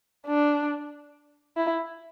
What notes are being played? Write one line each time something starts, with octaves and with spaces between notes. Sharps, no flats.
D4
E4